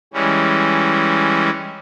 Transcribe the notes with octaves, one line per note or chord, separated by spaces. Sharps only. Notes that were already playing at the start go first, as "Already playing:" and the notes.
E3 G3 G#3 C#4